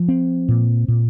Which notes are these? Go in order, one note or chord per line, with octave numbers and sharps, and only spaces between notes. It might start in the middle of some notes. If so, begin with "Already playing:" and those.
Already playing: F3
C4
A#2
A#2